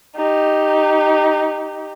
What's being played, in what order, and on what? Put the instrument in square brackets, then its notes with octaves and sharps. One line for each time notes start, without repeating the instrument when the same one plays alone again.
[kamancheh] D#4 G4